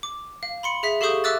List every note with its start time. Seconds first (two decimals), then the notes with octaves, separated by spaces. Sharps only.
0.03 D6
0.43 F5
0.63 B5 C6 C#7
0.83 G#4 E5 B6
1.01 G4 A4 F5 C#6 D#6 G6
1.24 E5 D6 E6 F#6 A6